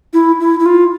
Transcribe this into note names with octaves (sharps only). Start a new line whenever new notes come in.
E4
E4
E4
F4